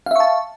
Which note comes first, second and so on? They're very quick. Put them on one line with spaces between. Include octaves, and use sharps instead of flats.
F5 E5 C#6 A5